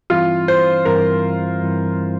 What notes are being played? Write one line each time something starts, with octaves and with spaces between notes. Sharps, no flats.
G2 E3 G3 C4 E4 F4
C5
G2 E3 G3 C4 E4 A#4
G2 E3 G3 C4 E4